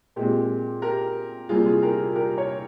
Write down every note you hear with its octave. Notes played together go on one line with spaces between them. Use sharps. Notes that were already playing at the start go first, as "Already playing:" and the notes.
A#2 G#3 C4 G4
G4 A#4
C3 G3 A#3 F4 G#4
F4 G#4
G4 A#4
G4 A#4
A#4 C#5